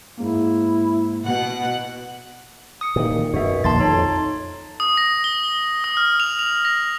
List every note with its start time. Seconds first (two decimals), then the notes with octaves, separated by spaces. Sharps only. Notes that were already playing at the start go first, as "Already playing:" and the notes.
0.17 G#2 A#3 E4
1.25 B2 F#5
2.81 D#6 C#7
2.96 A#2 D#3
3.34 F#2 B2 F#4 E5
3.64 A#1 D#2 A5 C6 A6
3.80 F2 D#4 C#5
4.80 D#6
4.97 A#6
5.24 G7
5.84 D#6
5.97 F6
6.20 F7
6.39 F7
6.65 A#6